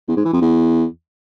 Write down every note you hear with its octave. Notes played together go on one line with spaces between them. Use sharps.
E2
G#2
E3
F2
E2